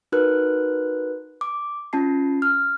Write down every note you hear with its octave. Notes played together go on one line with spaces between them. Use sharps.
D#4 F#4 A#4 B4 F#6
D6
C#4 F4 A5 C7
F6